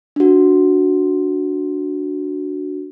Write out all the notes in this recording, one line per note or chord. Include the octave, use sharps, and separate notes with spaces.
D4 F#4